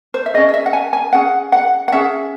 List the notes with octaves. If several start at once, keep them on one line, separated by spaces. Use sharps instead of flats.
C5
E5
C#4 G#4 D#5
D#5
E5
F#5
G#5
G#5
C#4 G#4 F#5
F#5
F#5
C#4 G#4 E5